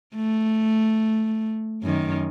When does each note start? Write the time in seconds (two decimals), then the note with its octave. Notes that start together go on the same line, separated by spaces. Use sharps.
0.15 A3
1.83 F#2 D#3